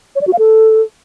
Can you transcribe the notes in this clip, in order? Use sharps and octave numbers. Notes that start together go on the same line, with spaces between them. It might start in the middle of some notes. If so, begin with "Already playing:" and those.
C#5
D5
F#4
F5
A4